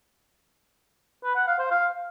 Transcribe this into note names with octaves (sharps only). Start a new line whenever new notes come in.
B4
F#5
F5
C5
F5